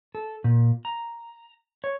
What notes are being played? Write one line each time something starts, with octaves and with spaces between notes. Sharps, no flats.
A4
A#2
A#5
C#5